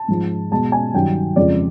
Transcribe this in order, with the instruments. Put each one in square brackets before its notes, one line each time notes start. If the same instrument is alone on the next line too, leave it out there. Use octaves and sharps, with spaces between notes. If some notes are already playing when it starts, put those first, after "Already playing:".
Already playing: [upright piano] A5
G#2 F3 G#3
B2 G#3 A5
G#5
G2 D#3 F#3 G5
F2 C#3 F3 G#3 D5